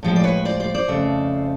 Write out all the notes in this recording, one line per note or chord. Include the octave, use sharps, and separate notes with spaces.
A2 F3 G#3
D5
B4 C#5
C5 D5
C5 D5
C5 D5
F2 C#3 F3 A3